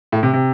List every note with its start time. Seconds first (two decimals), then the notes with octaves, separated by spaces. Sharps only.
0.12 A2
0.23 C3
0.33 C3